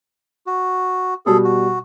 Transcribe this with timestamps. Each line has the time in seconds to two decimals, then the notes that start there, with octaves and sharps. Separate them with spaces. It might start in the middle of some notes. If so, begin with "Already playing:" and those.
0.47 F#4
1.26 B2 G3 G#4 A4
1.44 F#4